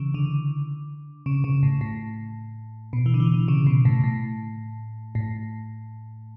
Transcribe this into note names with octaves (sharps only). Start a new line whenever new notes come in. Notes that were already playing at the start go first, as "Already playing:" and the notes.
Already playing: C#3 E3
D3
C#3
C#3
A2
A2
B2
E3
D3
E3
D3
C#3
B2
A2
A2
A2